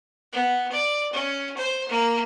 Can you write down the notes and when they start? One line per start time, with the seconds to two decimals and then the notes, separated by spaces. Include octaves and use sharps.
0.32 B3
0.72 D5
1.13 C#4
1.57 C5
1.89 A#3